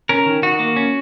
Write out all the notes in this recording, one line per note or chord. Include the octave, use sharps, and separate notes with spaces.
C#4 A#4
D#3
D#3 F#4
A#3
C#4